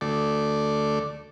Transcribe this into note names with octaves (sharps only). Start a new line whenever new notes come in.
D2 A3 D5